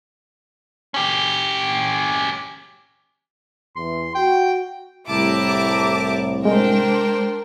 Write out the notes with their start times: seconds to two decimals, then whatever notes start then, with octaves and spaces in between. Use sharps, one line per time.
0.94 C#4 G4
3.76 E2 E3 C6
4.15 F#4 G5
5.08 C2 A2 E4 G4 A5 A#5 D6
6.45 G#3 D4 A#4 C5 G5